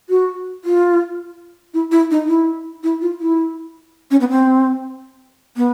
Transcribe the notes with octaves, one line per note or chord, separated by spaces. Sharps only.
F#4
F4
E4
E4
D#4
E4
E4
F4
E4
C#4
B3
C4
B3